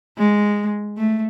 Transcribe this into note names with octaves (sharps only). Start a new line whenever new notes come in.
G#3
A3